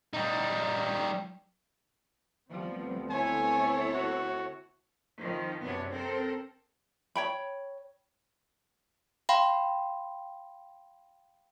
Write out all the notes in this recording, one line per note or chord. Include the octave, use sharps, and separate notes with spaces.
G3 D#4
D2 F3 G3 B3 C4
E4 A4 C#5 G#5
F#4
F2 D#3 F3
F#2 C3 B3 D4 C#5
C4 A4 A#4
C#5 G5 B5
F5 G5 B5 C6